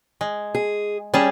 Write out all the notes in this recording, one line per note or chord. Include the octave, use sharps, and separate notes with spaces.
G#3
G#4
G3 C#4 G#4 A5